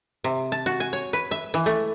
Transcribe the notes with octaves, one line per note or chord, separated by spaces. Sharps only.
C3
A5
F#4
G#5
C#5
B4
E5
E3
A3